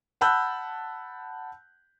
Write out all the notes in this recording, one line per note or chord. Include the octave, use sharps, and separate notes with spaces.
F#5 A5 B5 E6 F#6 G6